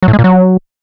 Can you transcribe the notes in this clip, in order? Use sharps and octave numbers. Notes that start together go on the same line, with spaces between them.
F#3
A2
G#3
A#2
F#3